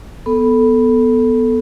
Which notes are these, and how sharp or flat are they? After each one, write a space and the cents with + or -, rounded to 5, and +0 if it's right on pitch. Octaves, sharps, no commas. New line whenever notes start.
B3 +0 A4 +0